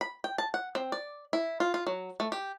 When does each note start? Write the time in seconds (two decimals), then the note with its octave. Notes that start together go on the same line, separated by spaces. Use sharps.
0.01 B5
0.24 G5
0.38 A5
0.54 F#5
0.75 C4
0.92 D5
1.33 E4
1.60 F4
1.74 F4
1.87 F#3
2.20 A3
2.32 G4